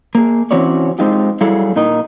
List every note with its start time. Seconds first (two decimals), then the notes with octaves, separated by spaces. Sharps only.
0.15 A#3 G#4
0.51 E3 C4 C#4 F#4 C#5 D5
0.99 G#3 C4 D#4 F4 G4
1.41 F#3 G3 E4 G#4 A4 F5
1.76 A#2 D#4 A#4 D#5